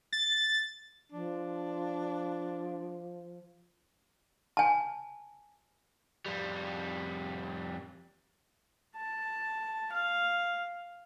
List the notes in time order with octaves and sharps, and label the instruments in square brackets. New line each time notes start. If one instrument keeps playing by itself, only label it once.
[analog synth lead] A6
[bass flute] F3 [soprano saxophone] D4
[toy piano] G#5 A5
[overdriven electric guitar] F2 G3
[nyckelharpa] A5
F5